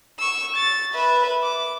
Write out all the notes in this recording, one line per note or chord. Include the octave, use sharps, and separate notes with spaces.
C#6 E6
A6
B4 E5
D6